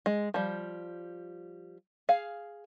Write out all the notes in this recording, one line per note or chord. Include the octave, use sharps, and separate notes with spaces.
G#3
F3 G3
G#4 F5